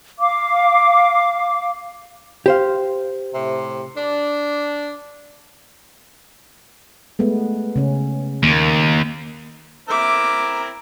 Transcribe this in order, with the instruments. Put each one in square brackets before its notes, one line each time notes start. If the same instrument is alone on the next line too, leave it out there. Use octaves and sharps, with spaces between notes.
[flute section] F5 D6
[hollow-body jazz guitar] G4 C5 F5
[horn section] A2 C3
D4
[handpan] G#3 A3 B3
C#3 C#4
[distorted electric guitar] D#2 [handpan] A#3
[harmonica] C4 E4 A#4 [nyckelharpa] E5 D6